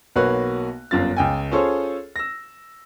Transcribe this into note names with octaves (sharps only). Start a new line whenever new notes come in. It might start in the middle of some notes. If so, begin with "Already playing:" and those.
B1 A#3 F#4 B4 C#5 F#6
G1 F#2 F4 A6
C#2 G5 G#5
C#4 F4 G#4 A4 C5 C#5
E6 A#6